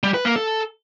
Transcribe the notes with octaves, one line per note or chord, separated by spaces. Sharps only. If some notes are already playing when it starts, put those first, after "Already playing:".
G3
B4
A#3
A4